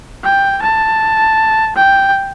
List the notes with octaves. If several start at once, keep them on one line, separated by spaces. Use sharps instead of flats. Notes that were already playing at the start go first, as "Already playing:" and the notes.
G5
A5
G5